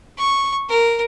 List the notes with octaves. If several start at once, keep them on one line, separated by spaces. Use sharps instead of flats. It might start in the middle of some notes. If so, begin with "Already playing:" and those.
C#6
A#4